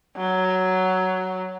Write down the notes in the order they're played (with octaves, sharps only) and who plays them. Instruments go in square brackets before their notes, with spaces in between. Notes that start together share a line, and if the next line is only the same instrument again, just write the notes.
[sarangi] F#3